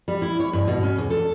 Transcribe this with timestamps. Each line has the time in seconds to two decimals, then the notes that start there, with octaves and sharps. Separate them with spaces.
0.08 G3
0.22 E4
0.40 C#5
0.53 G2
0.67 B2
0.83 C#4
0.98 E2
1.10 A4